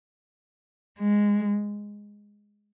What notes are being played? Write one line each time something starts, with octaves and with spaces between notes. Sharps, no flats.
G#3